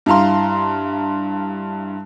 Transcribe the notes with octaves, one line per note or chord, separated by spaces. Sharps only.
G2 E4 F5 A#5 C6